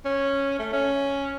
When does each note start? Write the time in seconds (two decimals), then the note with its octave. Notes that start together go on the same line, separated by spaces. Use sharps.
0.05 C#4
0.59 A3
0.73 C#4